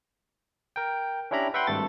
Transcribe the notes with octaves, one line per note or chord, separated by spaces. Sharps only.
A#4 G5
C#4 D4 E4 G4 A#5 B5
B4 E5 F#5 G5 B5 C6
G#1 G2 A3 A4 A6